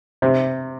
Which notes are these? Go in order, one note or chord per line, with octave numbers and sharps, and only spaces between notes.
C3